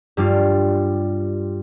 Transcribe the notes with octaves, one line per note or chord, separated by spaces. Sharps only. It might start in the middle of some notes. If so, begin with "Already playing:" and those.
G2 G3 F4